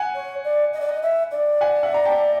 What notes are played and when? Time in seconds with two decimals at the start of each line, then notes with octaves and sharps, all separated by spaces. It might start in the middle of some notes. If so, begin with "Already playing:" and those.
Already playing: F#5 G#5
0.15 C#5
0.44 D5
0.73 D#5
0.80 D5
0.89 D#5
1.03 E5
1.31 D5
1.61 F#5 G#5
1.83 E5 F#5
1.94 A#5
2.05 G5 A5